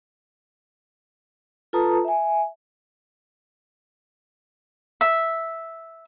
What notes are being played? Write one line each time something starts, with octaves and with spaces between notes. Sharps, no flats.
F4 A4 B4 A5 A#5 D#6
E5 G#5
E5